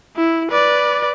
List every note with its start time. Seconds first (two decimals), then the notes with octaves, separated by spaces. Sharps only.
0.16 E4
0.51 B4 D5